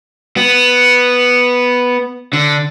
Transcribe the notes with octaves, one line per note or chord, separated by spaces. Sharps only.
B3
D3